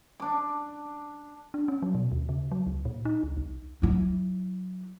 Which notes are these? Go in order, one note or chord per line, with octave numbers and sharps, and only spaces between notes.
D4 D6
D4
C#4
F#3
B2
D#2
C#3
F#3
C#2
A#2
D#4
C#2
C2
F#3 E4